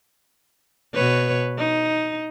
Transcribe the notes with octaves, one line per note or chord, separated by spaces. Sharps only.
B2 B4 C#5
D#4